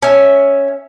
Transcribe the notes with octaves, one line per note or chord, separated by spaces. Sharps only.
C#4 E5